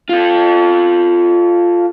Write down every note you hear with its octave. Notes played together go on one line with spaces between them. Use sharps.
F4 A4